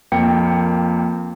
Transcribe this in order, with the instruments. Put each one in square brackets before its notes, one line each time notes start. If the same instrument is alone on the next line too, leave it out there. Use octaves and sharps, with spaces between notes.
[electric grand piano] F2 A#3 G5 C#7